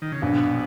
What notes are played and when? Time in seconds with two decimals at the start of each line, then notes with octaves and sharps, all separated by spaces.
0.02 D#3
0.12 C#3
0.22 A#1 B2